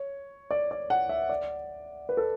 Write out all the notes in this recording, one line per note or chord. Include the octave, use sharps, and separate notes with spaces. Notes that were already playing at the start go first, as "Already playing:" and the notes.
Already playing: C#5
D5
D5
F#5
E5
D5
B4
A4